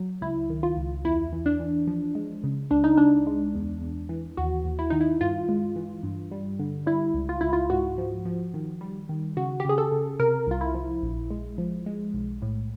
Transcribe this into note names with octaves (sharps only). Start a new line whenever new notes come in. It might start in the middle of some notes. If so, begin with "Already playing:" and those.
Already playing: F#3
C#2 E4
D#3
F4
C#2
E2 E4
E3
D4
E3
F3
G#3
C#3
C#2 D4
D#4
C#2 D4
G#3
E2
E2
E3
D#2 F#4
D#2
E4
D#3 D#4
E4
G2 F4
G#3
E3
G2
G3
D3
G3 E4
C#2
F4
C#2 E4
F4
G#2 F#4
F3
F3
D#3
G3
D#3
C#3 F#4
G4
C#3 G#4
A4
C#3
C3 A#4
C2 F4
E4
F3
A#1
G#3
F3
G#3
B1
A2